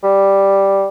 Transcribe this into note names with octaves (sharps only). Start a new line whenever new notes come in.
G3